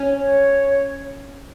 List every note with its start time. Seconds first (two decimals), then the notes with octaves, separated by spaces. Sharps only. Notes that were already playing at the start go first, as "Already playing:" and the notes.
Already playing: C#4
0.24 C#5